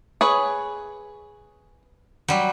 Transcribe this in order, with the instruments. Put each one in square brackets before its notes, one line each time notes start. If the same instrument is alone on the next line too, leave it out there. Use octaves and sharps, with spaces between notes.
[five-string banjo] G#4 B4 C#5
[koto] F#3 G3